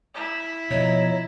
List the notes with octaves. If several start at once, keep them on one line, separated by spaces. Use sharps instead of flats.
E4
B2 F3 C#5 D#5 E5 A#5